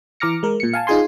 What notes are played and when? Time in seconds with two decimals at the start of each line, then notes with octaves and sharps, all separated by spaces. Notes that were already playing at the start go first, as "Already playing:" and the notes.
0.20 E3 A#5 D6 F6 A#6 C#7
0.43 G#3 A#4
0.60 A#2 C#7
0.73 F5 G#5 A5
0.87 D#4 F4 G#4 G#5 C6